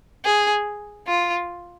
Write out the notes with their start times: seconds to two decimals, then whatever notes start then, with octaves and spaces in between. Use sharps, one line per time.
0.25 G#4
1.08 F4